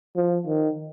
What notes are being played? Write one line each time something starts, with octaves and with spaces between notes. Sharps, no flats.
F3
D#3